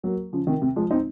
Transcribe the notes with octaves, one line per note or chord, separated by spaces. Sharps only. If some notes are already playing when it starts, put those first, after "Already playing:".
F#3 A#3
C#3 F3
C3 D#3
C3
F3 G#3
C4 D#4